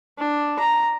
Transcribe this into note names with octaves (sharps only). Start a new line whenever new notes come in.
D4
A#5